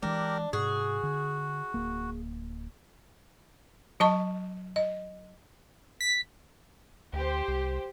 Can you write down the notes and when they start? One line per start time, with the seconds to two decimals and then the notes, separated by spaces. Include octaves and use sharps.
0.02 E3 G#3 D4 G4 A#4
0.53 G#2 C3 F#4 G#4
1.03 D3
1.74 D1 A#3
4.00 F#3 D#5 A5 C#6
4.76 D#5
6.01 B6
7.13 D2 G4 C5
7.48 C2